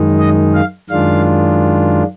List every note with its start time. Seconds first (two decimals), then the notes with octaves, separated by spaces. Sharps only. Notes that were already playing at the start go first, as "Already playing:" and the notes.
Already playing: F#2 D#3 G#3 D#4
0.19 D#5
0.54 F5
0.89 F#2 D#3 G#3 D4 F4 F5